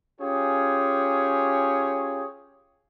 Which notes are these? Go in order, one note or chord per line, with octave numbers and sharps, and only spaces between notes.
C#4 F4 G4 G#4 C#5